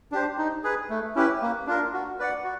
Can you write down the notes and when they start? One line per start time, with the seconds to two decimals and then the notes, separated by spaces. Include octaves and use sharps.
0.12 D4 G4 C5
0.38 D#4
0.64 G#4 B4
0.90 A3
1.15 C#4 E4 G4 B4
1.42 A#3
1.67 D4 F4 A#4
1.93 F#4
2.19 B4 D5 F#5
2.44 F#4